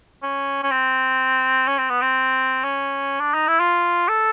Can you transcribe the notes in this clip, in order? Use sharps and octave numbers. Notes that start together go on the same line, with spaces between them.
C#4
C#4
C4
C#4
C4
B3
C4
C#4
D4
D#4
E4
F4
A4